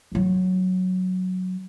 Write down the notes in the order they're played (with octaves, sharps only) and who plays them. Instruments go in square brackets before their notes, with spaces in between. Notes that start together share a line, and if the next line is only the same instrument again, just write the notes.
[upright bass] D3 F#3